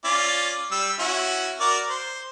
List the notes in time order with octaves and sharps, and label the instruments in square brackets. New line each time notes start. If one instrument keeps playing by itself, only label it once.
[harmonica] C#4 F4 D5
G3 E6
C#4 E4 F#4
F#4 A#4 D5
C5